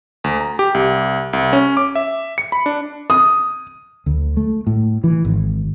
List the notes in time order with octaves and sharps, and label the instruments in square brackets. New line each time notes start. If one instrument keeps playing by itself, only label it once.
[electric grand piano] D2
A#5
G4
C2
C2
C#4
D6
E5
C#7
B5
D4
[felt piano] D#6
[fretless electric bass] D2
A3
A2
E3
G#1